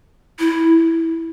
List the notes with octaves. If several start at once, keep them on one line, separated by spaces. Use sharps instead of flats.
E4